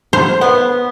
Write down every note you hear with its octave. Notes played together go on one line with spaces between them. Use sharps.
C5
B3